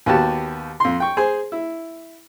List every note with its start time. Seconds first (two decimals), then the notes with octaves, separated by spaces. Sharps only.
0.06 D#2 B3 F#4 G4 A5
0.80 F2 C6
1.00 G5 C#6
1.17 G#4 C5 G#5
1.52 E4